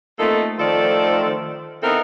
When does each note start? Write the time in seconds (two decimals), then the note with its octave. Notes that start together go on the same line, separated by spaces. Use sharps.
0.19 A3 A#3 C4 D#4 F4 A4
0.59 D#3 F3 A3 A4 C5 D5
1.83 B3 C4 D#4 E4 A4 A#4